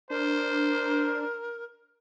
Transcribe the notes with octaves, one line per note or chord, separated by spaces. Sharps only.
D4 A#4 C5